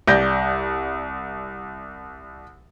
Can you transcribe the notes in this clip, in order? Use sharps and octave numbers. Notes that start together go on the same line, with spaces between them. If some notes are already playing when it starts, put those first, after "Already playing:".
C2 D5 G6 A#6